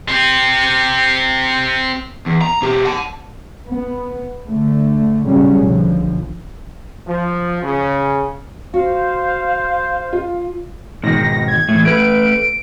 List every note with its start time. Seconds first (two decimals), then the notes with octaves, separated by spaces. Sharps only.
0.09 C4 G4
2.26 E2
2.42 A#5
2.62 B2 G4
2.85 F#5 A5
3.68 B3
4.46 D3 A3
5.25 A2 C#3 F#3 G3 C#4
5.62 B1 D3 F3
7.07 F3
7.63 C#3
8.74 F#4 C5 F5
10.13 F4
11.03 G#2 B2 D#3 A#6
11.48 G#6
11.69 E2 A2
11.85 A3 B4 D7